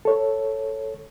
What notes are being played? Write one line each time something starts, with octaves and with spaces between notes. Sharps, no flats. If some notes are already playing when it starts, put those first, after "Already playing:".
A4 C#5